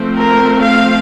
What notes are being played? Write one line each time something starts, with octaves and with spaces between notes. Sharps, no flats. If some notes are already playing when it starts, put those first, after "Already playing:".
Already playing: F3 A3 C4
A#4
F5